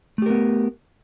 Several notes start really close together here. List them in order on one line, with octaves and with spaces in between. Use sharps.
A3 G4 A#4 B3